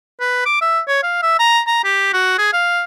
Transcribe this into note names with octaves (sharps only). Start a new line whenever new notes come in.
B4
D6
E5
C#5
F5
E5
A#5
A#5
G4
F#4
G#4
F5